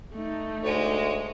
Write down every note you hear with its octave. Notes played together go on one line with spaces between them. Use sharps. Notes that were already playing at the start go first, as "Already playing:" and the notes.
A3 D#4
D2 G#3 C#5